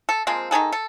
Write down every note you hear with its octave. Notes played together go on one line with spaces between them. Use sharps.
A4
F3 G#3 A#3 C4
D#3 D#4 G#4 A4
A4